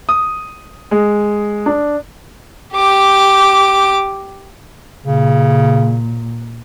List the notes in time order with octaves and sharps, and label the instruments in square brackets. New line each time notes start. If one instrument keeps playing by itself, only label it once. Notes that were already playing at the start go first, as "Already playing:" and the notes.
[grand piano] D#6
G#3
D4
[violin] G4 D6
[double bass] A#2 [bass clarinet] C#3